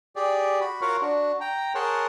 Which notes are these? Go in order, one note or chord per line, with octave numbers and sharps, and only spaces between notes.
G4 G#4 D5
F#4 B5
F4 F#4 A#4 C#5 F5 F#5
D4 F#4
G5 A#5
G#4 A#4 C#5 F#5 A5 C6